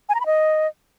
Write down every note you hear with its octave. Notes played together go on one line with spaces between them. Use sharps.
G#5
A#5
B5
D#5